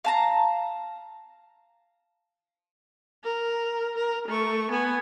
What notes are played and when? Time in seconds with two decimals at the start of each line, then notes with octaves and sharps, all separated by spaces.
0.05 F5 A5 A#5
3.24 A#4
3.97 A#4
4.28 A3 C#6
4.70 B3 G#5